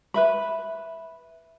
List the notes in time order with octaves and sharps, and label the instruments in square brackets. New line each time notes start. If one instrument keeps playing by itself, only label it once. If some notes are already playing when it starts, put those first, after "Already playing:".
[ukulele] B4 E5 B5